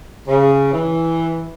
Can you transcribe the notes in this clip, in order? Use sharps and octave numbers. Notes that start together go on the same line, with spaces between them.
C#3
E3